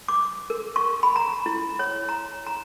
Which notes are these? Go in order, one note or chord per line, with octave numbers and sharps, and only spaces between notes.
D6
A#4
C#6
B5
A#5
E4
C#5
A#5
A#5